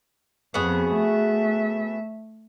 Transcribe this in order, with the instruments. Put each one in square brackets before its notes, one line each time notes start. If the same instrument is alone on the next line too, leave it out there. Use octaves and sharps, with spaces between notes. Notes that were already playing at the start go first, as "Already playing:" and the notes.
[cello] F2 [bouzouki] B3 F#4 G#4
[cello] A3 E5